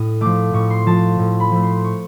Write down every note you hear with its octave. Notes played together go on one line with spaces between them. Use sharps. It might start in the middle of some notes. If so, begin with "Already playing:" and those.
Already playing: A2 D#6
F3 A3 D6
A2 C#6
C6
F3 A3 A5
A2
B5
F3 A3
C6
C#6